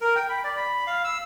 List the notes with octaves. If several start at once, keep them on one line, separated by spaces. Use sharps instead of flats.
A#4
G5
B5
D5
B5
F5
E6